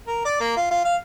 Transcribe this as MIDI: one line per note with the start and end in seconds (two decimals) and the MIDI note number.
0.07 0.22 70
0.25 0.35 74
0.40 0.53 58
0.56 0.66 65
0.71 0.84 65
0.85 0.96 77